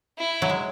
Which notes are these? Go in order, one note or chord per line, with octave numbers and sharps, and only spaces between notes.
E4
F#3
G#3